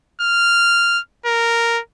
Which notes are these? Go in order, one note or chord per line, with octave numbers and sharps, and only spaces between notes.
F6
A#4